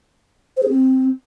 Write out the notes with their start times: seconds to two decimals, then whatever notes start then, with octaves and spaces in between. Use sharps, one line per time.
0.57 C5
0.63 G#4
0.69 C4